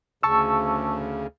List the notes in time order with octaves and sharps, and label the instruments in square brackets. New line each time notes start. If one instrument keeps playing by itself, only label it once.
[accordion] D2 C#3 [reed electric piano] A5 C#6 E6